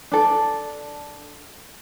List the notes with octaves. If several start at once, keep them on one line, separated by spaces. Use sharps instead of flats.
D4 A4